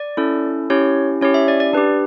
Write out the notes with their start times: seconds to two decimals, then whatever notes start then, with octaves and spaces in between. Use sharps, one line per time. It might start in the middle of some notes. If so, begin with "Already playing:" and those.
Already playing: D5
0.17 C#4 E4 A4
0.70 C#4 E4 G4 C#5
1.21 C#4 E4 G4 C#5
1.34 E5
1.48 D5
1.60 D5
1.73 D4 G4 B4